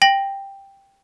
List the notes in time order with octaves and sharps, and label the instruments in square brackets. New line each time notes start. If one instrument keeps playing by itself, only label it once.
[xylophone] G5 A#6 F#7